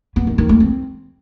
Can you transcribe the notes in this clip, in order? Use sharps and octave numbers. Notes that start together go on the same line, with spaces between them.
B3
D#3
D#3
A3
C4